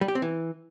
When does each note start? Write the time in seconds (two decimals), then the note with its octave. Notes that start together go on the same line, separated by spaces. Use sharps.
0.01 G3
0.08 G4
0.15 C4
0.22 E3